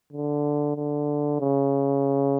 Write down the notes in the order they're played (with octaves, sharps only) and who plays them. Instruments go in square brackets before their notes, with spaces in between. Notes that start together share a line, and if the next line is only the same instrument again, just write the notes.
[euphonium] D3
D3
C#3